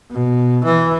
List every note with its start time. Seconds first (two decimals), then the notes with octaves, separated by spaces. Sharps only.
0.11 B2
0.65 E3